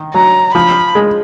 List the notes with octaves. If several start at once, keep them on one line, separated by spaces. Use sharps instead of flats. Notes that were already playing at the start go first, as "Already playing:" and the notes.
Already playing: D#3
F#3 A#5
F3 B5
G#3